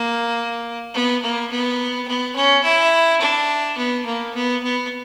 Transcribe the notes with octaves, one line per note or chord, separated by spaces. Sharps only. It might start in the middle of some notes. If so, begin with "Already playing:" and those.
Already playing: A#3
B3
A#3
B3
B3
C#4
E4
D4
B3
A#3
B3
B3